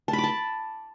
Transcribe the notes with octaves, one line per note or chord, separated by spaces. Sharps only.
A5
B5
D6
A5